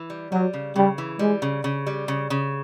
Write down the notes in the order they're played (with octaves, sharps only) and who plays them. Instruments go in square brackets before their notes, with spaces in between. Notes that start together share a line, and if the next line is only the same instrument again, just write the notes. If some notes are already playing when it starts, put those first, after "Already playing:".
Already playing: [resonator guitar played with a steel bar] E3
G3
[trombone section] F#3 [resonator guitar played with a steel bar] G3
[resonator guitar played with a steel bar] C#3
[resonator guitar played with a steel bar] C#3 [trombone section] G3
[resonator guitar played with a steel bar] E3
[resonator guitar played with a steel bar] G3 [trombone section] G#3
[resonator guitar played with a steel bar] C#3
C#3
G3
C#3
C#3